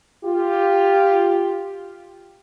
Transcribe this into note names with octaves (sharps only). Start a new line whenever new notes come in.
F4 G4